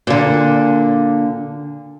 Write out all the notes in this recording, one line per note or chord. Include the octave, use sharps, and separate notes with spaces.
A#2 D3